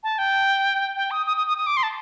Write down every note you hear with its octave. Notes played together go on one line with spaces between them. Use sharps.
A5
G5
G5
D#6
D#6
D#6
D#6
D#6
D6
C6
A5